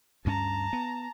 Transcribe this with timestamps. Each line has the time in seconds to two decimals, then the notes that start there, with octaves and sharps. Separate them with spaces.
0.25 D2 G2 C#4 A5 A#5
0.73 B3